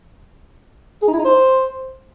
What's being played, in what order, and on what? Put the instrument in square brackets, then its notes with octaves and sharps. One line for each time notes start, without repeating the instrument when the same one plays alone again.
[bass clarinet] G#4
D#4
E4
D#4
C5